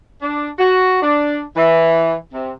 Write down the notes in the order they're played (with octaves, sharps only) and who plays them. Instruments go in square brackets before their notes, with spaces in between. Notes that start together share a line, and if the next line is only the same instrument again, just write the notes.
[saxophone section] D4
F#4
D4
E3
C3